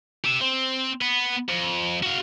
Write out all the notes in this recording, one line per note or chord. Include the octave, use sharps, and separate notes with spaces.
G4 E5
C4
B3
F2
F#4 F5